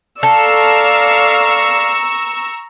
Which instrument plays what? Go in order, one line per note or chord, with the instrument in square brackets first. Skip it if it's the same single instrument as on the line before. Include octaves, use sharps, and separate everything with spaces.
[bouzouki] A4 [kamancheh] D5 F5 [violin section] A#5 C#6 E6